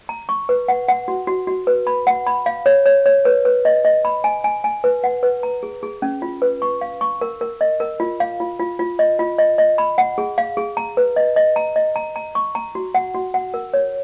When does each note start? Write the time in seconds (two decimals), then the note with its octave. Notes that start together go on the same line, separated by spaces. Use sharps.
0.09 A#5
0.29 C#6
0.49 B4
0.68 F#5
0.88 F#5
1.08 F#4
1.28 F#4
1.47 F#4
1.67 B4
1.87 B5
2.07 F#5
2.27 B5
2.46 F5
2.66 C#5
2.86 C#5
3.06 C#5
3.25 B4
3.45 B4
3.65 D#5
3.85 D#5
4.05 B5
4.24 G#5
4.44 G#5
4.64 G#5
4.84 B4
5.04 F#5
5.23 B4
5.43 A#5
5.63 G#4
5.83 G#4
6.02 C#4
6.22 F4
6.42 B4
6.62 C#6
6.81 F5
7.01 C#6
7.21 A#4
7.41 A#4
7.61 D#5
7.80 A#4
8.00 F4
8.20 F5
8.40 F4
8.60 F4
8.79 F4
8.99 D#5
9.19 F4
9.39 D#5
9.58 D#5
9.78 B5
9.98 F#5
10.18 G#4
10.38 F5
10.57 G#4
10.77 A#5
10.97 B4
11.16 D#5
11.36 D#5
11.56 A#5
11.76 D#5
11.96 A#5
12.16 A#5
12.35 C#6
12.55 A#5
12.75 F#4
12.95 F#5
13.14 F#4
13.34 F#5
13.54 A#4
13.74 C#5